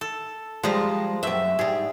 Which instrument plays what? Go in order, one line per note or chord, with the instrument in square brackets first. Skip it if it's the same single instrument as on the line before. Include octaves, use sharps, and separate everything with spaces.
[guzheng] A4
[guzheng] F3 A#5 [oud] G3 G#3
[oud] F#2 C4 [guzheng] E5
[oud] G#2 G3 [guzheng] G#4